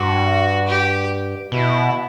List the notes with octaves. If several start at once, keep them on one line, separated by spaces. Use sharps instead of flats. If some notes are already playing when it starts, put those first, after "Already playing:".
Already playing: G2 F#4
G4
B2 E4